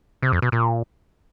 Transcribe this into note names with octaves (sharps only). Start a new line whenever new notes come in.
C3
F2
B2
A#2